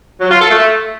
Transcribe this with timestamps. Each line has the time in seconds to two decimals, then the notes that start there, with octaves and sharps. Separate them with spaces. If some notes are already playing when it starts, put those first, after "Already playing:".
0.21 F#3
0.31 F4
0.41 A4
0.51 A3